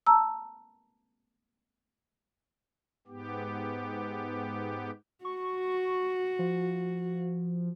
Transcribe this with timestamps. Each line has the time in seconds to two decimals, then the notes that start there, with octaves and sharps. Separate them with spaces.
0.06 A5 A#5 E6
3.07 G#2 B3 G4
5.25 F#4 C#6
6.39 F3